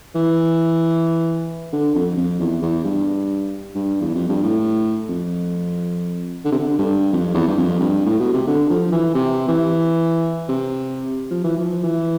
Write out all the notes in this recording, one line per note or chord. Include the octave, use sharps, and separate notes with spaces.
E3
D3
F2
F2
E2
E2
G2
G2
E2
F2
G2
A2
F2
D3
C3
D3
G2
F2
E2
G2
F2
G2
A2
B2
C3
D3
F3
E3
C3
E3
C3
F3
E3
F3
E3